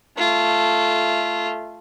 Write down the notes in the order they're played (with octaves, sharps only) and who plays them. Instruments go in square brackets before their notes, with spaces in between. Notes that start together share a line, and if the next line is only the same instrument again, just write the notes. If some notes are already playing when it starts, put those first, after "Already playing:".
[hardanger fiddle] A3 F4